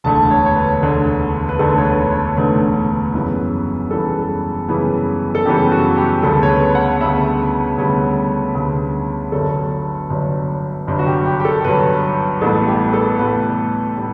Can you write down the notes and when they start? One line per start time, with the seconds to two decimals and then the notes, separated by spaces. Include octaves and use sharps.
0.04 E1 D2 D3 A3 A5
0.31 C#5
0.46 C#5
0.56 B4
0.81 E1 D2 D3 A3
1.49 B4
1.59 E1 D2 D3 A3 A4
1.78 C#5
1.85 B4
2.11 C#5
2.37 E1 D2 D3 A3 B4
3.14 F#2 C#3 E3 G3 B3
3.91 F#2 C#3 E3 G3 B3 A4
4.68 F#2 C#3 E3 G3 B3
5.35 A4
5.45 F#2 C#3 E3 G3 B3 G4
5.72 F#4
5.97 G4
6.23 D2 C#3 G3 B3 A4
6.43 C#5
6.49 B4
6.75 F#5
7.01 D2 C#3 G3 B3 E5
7.78 D2 C#3 G3 B3 C#5
8.55 D2 C#3 G3 B3
9.32 G1 G2 F#3 A4
10.10 G1 G2 F#3
10.87 G1 G2 F#3
10.99 F#4
11.07 G4
11.26 G4
11.40 G4
11.45 A4
11.64 G1 G2 F#3 B4
12.41 A1 A2 G3 B3 A4
12.68 G4
12.88 B4
12.93 A4
13.19 A1 A2 G3 B3 B4
13.97 A2 G3